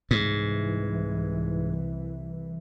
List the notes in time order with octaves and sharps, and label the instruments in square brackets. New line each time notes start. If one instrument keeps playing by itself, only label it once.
[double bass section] C2 E3 [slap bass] G#2